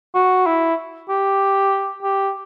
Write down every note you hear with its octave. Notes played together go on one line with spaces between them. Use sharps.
F#4
E4
G4
G4